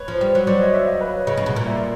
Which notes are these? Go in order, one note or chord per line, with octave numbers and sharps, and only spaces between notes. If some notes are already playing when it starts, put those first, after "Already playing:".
Already playing: B4 C#5
F3
G3
F#3
F#3 C5 D5
C#5 D#5
D5 E5
D#5 F5
B4 C#5
C#3 C#5 D#5
C#3
B2
A#2
D5 E5